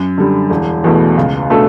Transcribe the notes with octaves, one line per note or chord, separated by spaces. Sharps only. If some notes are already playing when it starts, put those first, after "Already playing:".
Already playing: F#2
D3 G3
E1
E2 B2 A3
C#2
B2 A3 D4 A4